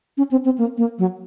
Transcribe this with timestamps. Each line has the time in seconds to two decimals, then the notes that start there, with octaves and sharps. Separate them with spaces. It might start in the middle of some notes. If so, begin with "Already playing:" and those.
0.17 C#4
0.31 C4
0.45 C4
0.58 A#3
0.77 A#3
0.99 F#3